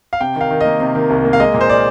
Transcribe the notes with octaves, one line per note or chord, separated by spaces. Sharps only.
F5
C3 G5
D#3 F5
D#3
A#3 D#5
C3
D#3
C2
A#3
F5
G#3 D#5
A#2
C5
D5